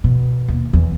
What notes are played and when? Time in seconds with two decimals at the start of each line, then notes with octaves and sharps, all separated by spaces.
0.04 B2
0.48 D#2
0.73 E2